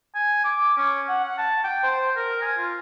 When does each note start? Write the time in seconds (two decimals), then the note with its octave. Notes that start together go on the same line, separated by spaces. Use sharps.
0.15 G#5
0.44 D6
0.77 C#4
1.08 F#5
1.24 F#5
1.38 A5
1.64 G5
1.83 C5
2.16 A#4
2.42 G#5
2.57 F4